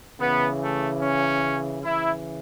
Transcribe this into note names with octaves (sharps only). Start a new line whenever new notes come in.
C#3 E3 B3
A3
C#4
C#3 E3 E4